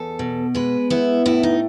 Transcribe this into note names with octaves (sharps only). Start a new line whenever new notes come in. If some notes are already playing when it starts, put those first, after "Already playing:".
Already playing: E2 A4
B2
G#3 B4
B3 E4
A2 E4
D#4